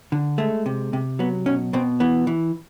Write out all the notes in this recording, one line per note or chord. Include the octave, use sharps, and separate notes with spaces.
D3
G#3 A3
C3
C3
F#3 B3
B2 C#4
B2 C4
E3 B3
E3